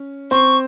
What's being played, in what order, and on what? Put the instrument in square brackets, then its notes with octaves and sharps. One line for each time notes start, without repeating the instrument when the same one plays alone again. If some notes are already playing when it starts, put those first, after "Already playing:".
Already playing: [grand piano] C#4
[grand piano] C4 C5 [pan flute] C#6